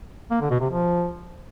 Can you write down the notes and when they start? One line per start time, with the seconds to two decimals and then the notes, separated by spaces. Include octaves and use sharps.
0.31 A#3
0.41 D3
0.51 B2
0.60 C3
0.70 F3